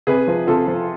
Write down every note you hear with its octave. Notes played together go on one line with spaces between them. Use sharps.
C3 G#4 B4
F3
C3 F4 A4
F3